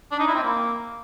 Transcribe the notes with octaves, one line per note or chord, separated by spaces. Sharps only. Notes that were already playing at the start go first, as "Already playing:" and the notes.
D4
D#4
E4
C4
A#3